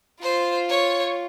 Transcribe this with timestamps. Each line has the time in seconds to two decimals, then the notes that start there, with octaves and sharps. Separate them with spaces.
0.22 F4 C5
0.69 C#5